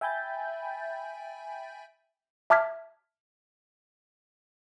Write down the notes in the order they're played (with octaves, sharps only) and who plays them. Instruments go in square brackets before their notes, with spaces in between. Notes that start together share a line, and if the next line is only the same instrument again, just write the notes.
[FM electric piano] E5 G5 G#5 B5 G6 A6
[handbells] E5 A5 D6 F6 G#6 B6